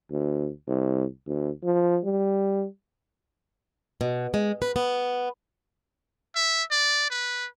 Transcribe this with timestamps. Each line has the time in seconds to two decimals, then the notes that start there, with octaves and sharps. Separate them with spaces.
0.11 D2
0.68 C2
1.27 D2
1.64 F3
2.04 G3
4.01 B2
4.34 G#3
4.62 B4
4.76 B3
6.36 E5
6.71 D5
7.10 B4